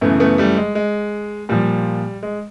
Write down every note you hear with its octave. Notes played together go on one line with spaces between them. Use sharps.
F#2 C#3 E3 A3 B3
A3 B3
G3 A3
G#3
G#3
A#2 F3 G3
G#3